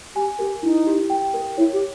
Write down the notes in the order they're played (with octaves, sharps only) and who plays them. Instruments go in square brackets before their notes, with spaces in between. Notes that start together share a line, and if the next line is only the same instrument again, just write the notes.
[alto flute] G4 [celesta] G#5
[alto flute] G4 [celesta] A#4
[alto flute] D#4 [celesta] E4
[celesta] G4
G5
A#4
[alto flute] E4 [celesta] C#5
[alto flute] G4